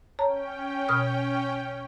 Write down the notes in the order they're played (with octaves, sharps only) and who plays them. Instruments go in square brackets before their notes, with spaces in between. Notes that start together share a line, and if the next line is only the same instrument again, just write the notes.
[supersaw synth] C#4 G5 [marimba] C#5 A5 A#5
[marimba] B2 D#6 F6